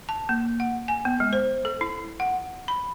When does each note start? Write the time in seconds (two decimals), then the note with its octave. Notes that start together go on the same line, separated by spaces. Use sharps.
0.09 A5
0.29 A#3
0.60 F#5
0.88 G#5
1.05 B3
1.20 G#3
1.33 C5
1.65 A4
1.81 E4
2.20 F#5
2.68 B5